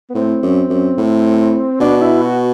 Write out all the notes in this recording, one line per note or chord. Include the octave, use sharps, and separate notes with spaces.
B3
A2 C4
F#2
F#2
A2
B2 D4
E4
F#4